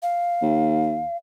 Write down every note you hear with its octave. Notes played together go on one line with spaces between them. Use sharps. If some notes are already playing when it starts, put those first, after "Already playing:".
F5
D#2